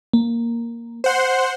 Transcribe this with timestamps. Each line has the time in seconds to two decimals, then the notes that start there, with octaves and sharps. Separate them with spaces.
0.13 A#3
1.04 C5 F#5 C6